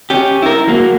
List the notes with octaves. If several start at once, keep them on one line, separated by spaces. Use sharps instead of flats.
C#4 G4
E4 A#4
F#3 A#3